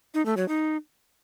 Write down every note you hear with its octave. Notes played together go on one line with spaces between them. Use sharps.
D#4
A3
F#3
D#4